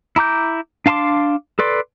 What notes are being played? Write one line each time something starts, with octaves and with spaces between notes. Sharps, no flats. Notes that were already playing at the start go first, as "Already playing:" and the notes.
E4 A#5 D6 G6
D4 F5 A5 C6 D6
A4 B4 D5 C6